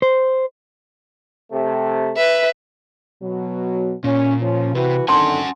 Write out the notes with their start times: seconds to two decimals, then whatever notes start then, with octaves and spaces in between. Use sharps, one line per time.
0.02 C5
1.52 C3 A3
2.17 B4 E5
3.22 B2 F#3
4.04 A#2 C#4
4.42 F3 C#4
4.75 C3 E3 F#4 B4
5.08 D3 D#3 C4 C#4 F#5 G#5 A5 C6